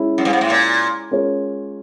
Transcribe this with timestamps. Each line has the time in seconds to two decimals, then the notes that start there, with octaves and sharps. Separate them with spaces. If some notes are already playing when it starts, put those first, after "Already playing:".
Already playing: G#3 C#4 E4
0.18 F#2
0.25 G2
0.33 G#2
0.41 A2
0.50 A#2
1.11 G#3 C#4 F4 A#4 C#5